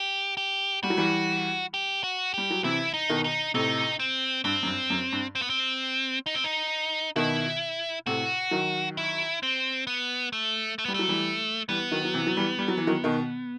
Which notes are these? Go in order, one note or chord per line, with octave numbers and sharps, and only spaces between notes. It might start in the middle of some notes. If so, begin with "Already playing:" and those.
Already playing: G4
G4
G3 F#4
F#3
E3 G3
G4
F#4
G3 G4
F#3
C3 E3 E4
D#4
B2 D#3
D#4
A2 C3 D#4
C4
G2 C4
F#2
G2
F#2
G2
C4
B3
C4
D#4
C4
D#4
B2 D#3 E4
A2 C3 F#4
D#3 F#3
E4
C4
B3
A3
A3
B3
G3
F#3 A3
E3 G3
E3 G3 B3
D#3 F#3
F#3
C3 E3
F#3
E3 G3
G3
F#3
E3
D#3 F#3
B2 D#3